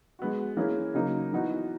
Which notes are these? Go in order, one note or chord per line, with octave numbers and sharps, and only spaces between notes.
G#3 B3 F#4
E3 A#3 C#4 G#4
C#3 F#3 A#3 D#4
E3 B3 D#4 F#4